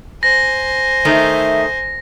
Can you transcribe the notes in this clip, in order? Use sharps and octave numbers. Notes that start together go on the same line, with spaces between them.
C5 G#5 A#6
D#3 A3 D#4 E5